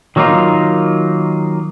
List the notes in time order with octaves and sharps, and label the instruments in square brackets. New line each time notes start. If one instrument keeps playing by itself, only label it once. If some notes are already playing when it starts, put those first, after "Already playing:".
[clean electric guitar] D#3 F#3 A#3 D#4 F4